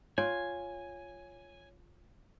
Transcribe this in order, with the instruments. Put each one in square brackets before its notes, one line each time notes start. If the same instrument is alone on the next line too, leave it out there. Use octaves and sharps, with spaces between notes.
[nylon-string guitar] F4 [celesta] C#5 [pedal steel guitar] G#5